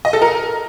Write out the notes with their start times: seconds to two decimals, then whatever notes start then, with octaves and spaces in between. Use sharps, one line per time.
0.05 D#5
0.13 A4
0.22 A#4